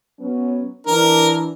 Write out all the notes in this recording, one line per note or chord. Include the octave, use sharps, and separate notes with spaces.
F#3 B3 C#4
E3 D4 A#4